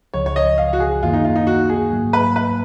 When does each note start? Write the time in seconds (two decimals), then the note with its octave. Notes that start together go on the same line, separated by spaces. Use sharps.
0.14 C#2 C#3 F3 C#5
0.26 C#5
0.36 D#5
0.58 F5
0.73 F#4
0.80 G#4
1.03 F#2 D#3 A#3 F4
1.13 D#4
1.25 F4
1.36 D#4
1.47 F#4
1.70 G#4
1.92 G#2 F#3 A#3
2.13 B4
2.36 B4